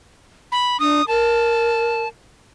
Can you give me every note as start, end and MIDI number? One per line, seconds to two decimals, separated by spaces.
0.52 0.80 83
0.80 1.02 62
0.80 1.07 87
1.08 2.01 70
1.08 2.08 81